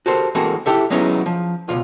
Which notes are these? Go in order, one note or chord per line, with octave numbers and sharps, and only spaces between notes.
F#4 G4 A4 A#4 C5
E3 G#3 A#3 C4 F#4 A4
E4 G4 A4 E5
F#3 G#3 B3 C#4 D#4 E4
F3
C#2 G#2 B2 F4